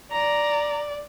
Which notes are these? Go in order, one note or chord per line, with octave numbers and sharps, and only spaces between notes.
D5 A#5